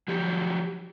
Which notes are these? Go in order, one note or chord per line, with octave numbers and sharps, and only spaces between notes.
F3 F#3 G4